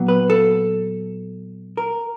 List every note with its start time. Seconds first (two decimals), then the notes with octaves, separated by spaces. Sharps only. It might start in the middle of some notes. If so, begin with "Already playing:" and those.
Already playing: A#2 F#3 B3
0.08 B4
0.30 A4
1.77 A#4